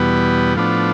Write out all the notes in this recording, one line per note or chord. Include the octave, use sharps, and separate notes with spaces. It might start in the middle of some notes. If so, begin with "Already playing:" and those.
Already playing: E2 B2 G3 B3
A2 F3 B3 D4